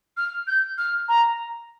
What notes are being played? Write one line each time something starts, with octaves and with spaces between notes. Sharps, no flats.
F6
G6
F6
A#5